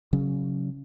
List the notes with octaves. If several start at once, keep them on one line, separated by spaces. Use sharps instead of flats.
C#3 F#3 C#4